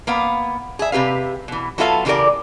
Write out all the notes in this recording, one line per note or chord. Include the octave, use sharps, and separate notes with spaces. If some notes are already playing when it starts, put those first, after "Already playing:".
A#3 B3 F5
G#4 E5
C3 G4 B4 F5
B2 E3
F#3 B3 F4 A4 E5 F5
C#3 E3 E4 G4 A#4 D5